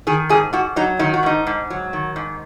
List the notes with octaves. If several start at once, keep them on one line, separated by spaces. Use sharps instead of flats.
D#3 G#4
G#2 G#4
G#2 F#4
F#3 D#4
D#3 D#4
F#4
G#2 D#4
G#2
F#3
D#3
G#2